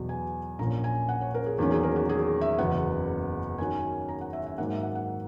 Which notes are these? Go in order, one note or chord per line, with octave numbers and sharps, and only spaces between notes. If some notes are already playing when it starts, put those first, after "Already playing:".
Already playing: E2 B2 F#3 B3
G#5
A#1 A#2 A#3 C#4 A#5
G#5
F#5
C#5
A#4
G#4
E2 D#3 F#3 A#3 C#4 F#4
G#4
A#4
F#4
G#4
E5
F#1 E2 C#3 F#3 B3 F#5
F#2 D#3 F#3 C#4 G#5
A#5
F#5
E5
E5
G#2 D#3 F#3 A#3 F#5
E5
F#5
F#5